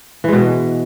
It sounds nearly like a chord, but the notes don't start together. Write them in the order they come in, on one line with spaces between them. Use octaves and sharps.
E3 G#3 B2